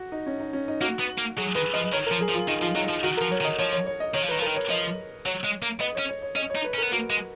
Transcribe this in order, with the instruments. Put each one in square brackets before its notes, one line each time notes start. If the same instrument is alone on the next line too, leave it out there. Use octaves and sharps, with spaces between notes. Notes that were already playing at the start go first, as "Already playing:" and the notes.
Already playing: [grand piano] F#4
D#4
C#4
D#4
C#4
D#4
[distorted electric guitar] A#3 [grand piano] F#4
[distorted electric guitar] B3
A#3
[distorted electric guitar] F#3 [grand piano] G#4
[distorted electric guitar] D#3 [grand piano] B4
[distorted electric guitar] F3 [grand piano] D#5
[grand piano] D#5
[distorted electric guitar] D#3 [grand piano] C#5
[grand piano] A#4
[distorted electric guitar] F3
[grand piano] G#4
[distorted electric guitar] F3
[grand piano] F4
[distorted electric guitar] D#3 [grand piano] D#4
[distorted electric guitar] F3 [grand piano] F4
[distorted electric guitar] F#3 [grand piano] D#4
[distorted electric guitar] F3
[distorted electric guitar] D#3 [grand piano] F#4
[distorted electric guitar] F3 [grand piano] A#4
[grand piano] C#5
[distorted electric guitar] D#3
[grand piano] D#5
[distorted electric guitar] F3 [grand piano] C#5
[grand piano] C#5
C#5
D#5
[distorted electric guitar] D#3 [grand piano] C#5
[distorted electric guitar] F3
[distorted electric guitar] D#3 [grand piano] B4
[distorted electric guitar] F3
[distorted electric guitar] D#3 [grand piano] A#4
[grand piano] C#5
[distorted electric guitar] F3 [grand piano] D#5
[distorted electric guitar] F#3 [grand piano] C#5
[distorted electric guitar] G#3
A#3
[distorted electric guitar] B3 [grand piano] D#5
[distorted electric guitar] C#4 [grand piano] C#5
[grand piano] C#5
C#5
[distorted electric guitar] C#4 [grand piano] D#5
[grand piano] C#5
[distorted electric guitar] D#4
[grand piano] B4
[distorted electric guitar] C#4
[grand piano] A#4
[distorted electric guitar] B3
[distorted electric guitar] A#3 [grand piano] F#4
[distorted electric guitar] G#3